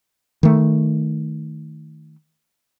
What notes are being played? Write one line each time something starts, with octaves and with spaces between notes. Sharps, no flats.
D#3 A3